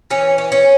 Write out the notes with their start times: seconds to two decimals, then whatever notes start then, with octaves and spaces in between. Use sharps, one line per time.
0.10 E3 C#4
0.38 C#4
0.52 C#4